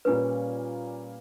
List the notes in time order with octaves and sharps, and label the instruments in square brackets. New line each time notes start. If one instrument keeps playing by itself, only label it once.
[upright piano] A#2 G3 A#3 C#4 [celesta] B4